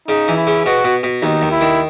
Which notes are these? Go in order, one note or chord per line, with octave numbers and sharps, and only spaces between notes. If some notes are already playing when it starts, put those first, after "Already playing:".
C#3 D#4
E3
E4
C#3
B2 F#4
B2
B2
D#2 D#4
D#2
E4
D#3